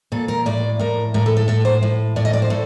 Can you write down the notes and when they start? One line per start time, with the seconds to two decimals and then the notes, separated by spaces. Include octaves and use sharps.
0.12 A#2 A4
0.28 A#4
0.46 A2 D5
0.79 A2 A#4
1.14 A2 A#4
1.26 A4
1.37 A4
1.48 A2 A4
1.65 C5
1.83 A2
2.16 A2 D5
2.25 D#5
2.33 D5
2.42 C5
2.50 A2 A4